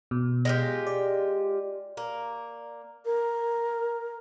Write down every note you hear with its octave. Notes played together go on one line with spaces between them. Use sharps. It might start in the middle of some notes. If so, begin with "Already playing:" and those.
B2
G#3 F4 G4
D5
A#3
A#4